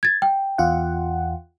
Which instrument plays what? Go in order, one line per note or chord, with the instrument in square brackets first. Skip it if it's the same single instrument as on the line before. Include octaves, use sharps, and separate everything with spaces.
[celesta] G#6 A6
G5
[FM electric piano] E2 F4 F#5